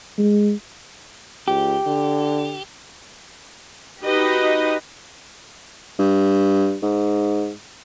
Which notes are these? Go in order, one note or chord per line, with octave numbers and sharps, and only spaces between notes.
G#3
C#2 G4
D3
D#4 F#4 G4 B4 D#5
G2
G#2